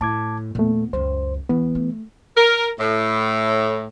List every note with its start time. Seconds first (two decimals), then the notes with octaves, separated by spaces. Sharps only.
0.01 A2 A5 D6 G#6
0.55 E2 A#2 A3 B3
0.93 C#2 F#2 C5
1.49 E2 E3 B3
1.75 A3
2.37 A#4
2.79 A2